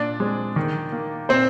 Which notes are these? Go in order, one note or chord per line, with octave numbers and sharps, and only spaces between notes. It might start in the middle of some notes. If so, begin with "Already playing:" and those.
Already playing: A#2 D4 D5
G#3 C4
D#3
A#3
A#2 C4 C5